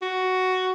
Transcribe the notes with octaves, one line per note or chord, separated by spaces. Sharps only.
F#4